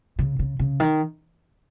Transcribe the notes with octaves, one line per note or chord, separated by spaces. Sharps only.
C#3
C#3
C#3
D#3